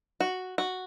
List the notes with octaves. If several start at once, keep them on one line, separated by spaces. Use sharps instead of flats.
F#4
F#4